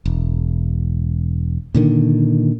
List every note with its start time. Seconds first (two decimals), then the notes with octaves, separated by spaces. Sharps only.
0.05 E1
1.75 A#2 D3 D#3